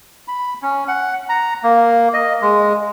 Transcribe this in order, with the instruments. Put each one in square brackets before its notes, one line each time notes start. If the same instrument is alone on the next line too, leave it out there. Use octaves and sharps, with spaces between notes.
[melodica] B5
C#4
F#5
A#5
A#3
D#5
G#3